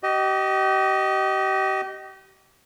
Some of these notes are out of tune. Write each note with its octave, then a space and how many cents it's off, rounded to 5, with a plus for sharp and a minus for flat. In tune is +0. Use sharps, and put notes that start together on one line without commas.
G4 -35 D#5 +0